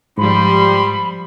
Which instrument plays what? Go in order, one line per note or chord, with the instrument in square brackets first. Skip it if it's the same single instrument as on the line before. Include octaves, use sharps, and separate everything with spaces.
[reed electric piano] G#2 [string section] F3 G3 [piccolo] B5 [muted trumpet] C6